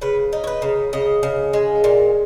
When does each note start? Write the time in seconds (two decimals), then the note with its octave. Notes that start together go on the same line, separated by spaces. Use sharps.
0.01 C#3 B4
0.33 D#4
0.44 C#5
0.47 B4
0.62 C#3
0.93 C#3 D#5
1.23 C#3
1.53 G#3
1.84 A#2